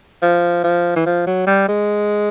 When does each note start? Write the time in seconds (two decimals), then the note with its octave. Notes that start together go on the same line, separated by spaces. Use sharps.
0.22 F3
0.64 F3
0.96 E3
1.06 F3
1.27 F#3
1.47 G3
1.69 G#3